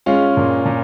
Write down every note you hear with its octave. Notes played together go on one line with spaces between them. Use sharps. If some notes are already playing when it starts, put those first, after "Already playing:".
G#3 C#4 F4
A#2
A#2